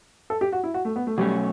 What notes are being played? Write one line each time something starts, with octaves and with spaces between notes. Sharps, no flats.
A4
G4
F#4
E4
F#4
A3
B3
A3
B2 F#3 G3 A3 C#4